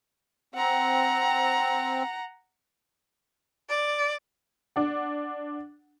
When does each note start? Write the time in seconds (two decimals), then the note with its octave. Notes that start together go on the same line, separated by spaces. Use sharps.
0.55 C4 F#5 A#5
3.69 D5
4.76 D4 F#5